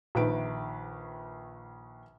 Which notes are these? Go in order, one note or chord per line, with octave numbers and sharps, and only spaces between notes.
A#1 D#3 B4 D7